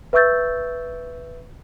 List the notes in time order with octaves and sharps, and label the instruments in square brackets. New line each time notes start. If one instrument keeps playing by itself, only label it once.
[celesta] B4 E5 C#6 E6 G6 A6